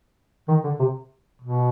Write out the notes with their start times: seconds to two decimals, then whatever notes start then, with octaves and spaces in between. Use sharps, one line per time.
0.48 D#3
0.64 D3
0.79 C3
1.42 B2